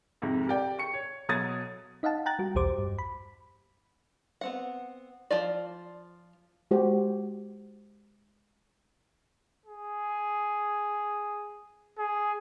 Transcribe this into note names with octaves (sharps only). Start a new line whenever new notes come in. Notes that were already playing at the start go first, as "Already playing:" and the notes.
F2 G#2 C3
G4 A#4 D5 G5
C#6 C#7
C#5
B2 F#3 A4 D#6 G#6 A6
D#4 D#5 F5 F#5 A5
G5 A#5 F#6 A6
G3 F#4
B1 E2 G4 C5 D6
G2
B5
B3 C4 F#5
F3 F4 D5
G#3 F#4 G4 C5
G#4
G#4